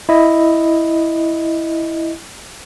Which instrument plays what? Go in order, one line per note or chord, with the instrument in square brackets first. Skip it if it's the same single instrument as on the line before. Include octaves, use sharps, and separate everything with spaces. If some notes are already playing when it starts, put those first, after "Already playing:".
[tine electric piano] E4 D#5